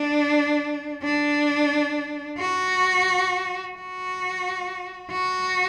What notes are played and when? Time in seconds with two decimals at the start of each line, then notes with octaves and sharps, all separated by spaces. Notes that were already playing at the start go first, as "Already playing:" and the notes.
Already playing: D4
1.03 D4
2.39 F#4
3.75 F#4
5.12 F#4